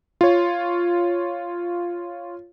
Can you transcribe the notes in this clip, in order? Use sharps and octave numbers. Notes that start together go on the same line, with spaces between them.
F4 C#5